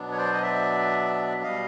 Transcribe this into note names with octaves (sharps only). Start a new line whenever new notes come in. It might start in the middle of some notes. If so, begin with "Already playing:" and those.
Already playing: B2 F#3 B3 D4
C#5
C5 D5
D#5
D5 E5
B2 G3 D#5 F5